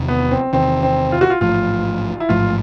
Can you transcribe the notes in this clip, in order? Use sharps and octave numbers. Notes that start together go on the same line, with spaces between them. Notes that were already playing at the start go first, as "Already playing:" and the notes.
Already playing: E2 C3 D#3
B3
C4
E2 C3 D#3 C4
C4
F4
F#4
F4
A1 G#2 F3 A3 F4
E4
A1 G#2 F3 A3 F4